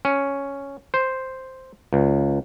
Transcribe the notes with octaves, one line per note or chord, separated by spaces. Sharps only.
C#4
C5
C#2